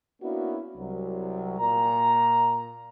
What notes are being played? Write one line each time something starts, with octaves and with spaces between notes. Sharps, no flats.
A#3 B3 C#4 D4 E4 F#4
C2 F#3
A#2 A#5